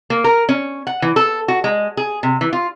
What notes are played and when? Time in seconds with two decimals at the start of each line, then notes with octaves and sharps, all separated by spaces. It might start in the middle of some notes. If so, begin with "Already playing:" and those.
0.10 A#3
0.24 A#4
0.49 C#4
0.87 F#5
1.02 E3
1.16 A4
1.48 F#4
1.64 G#3
1.97 G#4
2.23 C3
2.41 E3
2.53 F4